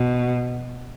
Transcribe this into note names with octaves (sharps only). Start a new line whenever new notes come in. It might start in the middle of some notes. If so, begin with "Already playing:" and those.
Already playing: B2